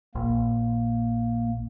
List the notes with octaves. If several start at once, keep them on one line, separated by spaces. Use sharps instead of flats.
A#1 A#3